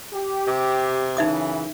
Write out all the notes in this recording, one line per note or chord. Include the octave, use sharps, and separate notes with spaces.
G4
C3
F#2 C#3 E3 D#4 E5 D#6